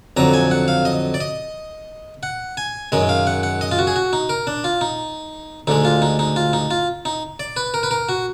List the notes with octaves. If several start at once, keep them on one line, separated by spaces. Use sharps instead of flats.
F2 D3 F#3 A#5
G#5
F#5
F5
D#5
D5
D#5
F#5
G#5
F#2 D#3 G#3 D#5
F5
F#5
F#5
D#5
F4
F#4
G#4
F#4
D#4
A#4
D4
F4
D#4
D2 D3 G#3 D#4
F4
D#4
D#4
F4
D#4
F4
D#4
D5
B4
A#4
B4
A#4
F#4